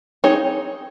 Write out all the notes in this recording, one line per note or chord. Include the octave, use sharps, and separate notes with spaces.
C4 D#4 G#4 C#5